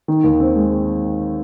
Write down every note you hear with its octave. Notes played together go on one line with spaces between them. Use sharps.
D#3
D#2
C4
G#3